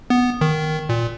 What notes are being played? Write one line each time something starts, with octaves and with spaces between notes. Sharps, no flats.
B3
D#3
A#2